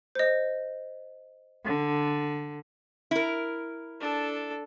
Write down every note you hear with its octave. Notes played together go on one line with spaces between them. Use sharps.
C5 D#5
D3
E4 A#4
D4 A4